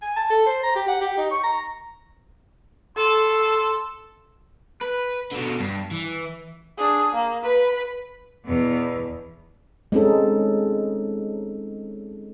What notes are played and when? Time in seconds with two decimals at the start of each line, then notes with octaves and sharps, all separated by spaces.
0.02 G#5
0.16 A5
0.30 A4
0.46 C5
0.63 A#5
0.76 G4
0.88 F#5
1.01 G4
1.18 D#4
1.31 C#6
1.43 A#5
2.97 A4 C6
4.82 B4
5.32 B2 D3
5.60 G2
5.91 E3
6.77 D4 G#4
7.13 A#3
7.43 B4 B5
8.45 E2 B2
9.92 G#3 C4 C#4 D#4 A4